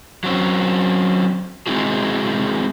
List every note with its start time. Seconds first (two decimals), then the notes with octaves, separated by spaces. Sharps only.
0.24 F#3 C4 C#4
1.67 G#3 C4 D#4 E4 F#4 G#4